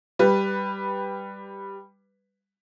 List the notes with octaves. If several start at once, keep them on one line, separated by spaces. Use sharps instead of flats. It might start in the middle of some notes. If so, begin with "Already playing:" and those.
G3 B4